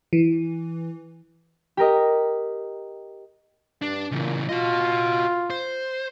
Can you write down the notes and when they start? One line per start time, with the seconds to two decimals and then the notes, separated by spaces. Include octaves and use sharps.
0.13 E3
1.77 G4 A#4 D#5
3.82 G2 D4
4.11 A#2 C#3 E3
4.49 F4 F#4 D#5
5.50 C5